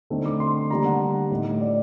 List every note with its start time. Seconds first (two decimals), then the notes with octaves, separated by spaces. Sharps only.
0.10 D3 A3 C4 D#4
0.26 D6
0.40 C6
0.70 D3 G3 A#3 D4 A#5
0.85 F#5
1.31 A2 A3 D#4
1.61 D5